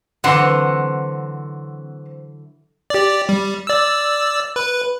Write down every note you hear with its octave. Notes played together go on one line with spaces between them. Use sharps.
D3 E3 F#3 C4 F#5
G4 D5
G3
D5 E6
B4